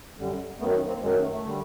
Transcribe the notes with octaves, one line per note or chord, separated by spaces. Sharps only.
F#2 D3 G3
F#2 D#3 F#3 A3 B3
A#3 C4
F#2 D#3 F#3 G#3
A3
A3
A3
D3 G3